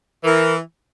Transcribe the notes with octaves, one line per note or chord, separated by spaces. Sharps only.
E3 A#4